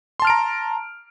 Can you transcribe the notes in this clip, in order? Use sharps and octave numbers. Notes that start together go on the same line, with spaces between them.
A5 A#5 C6 F6 D7